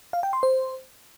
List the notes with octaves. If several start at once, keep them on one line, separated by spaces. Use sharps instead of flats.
F5
G5
C6
C5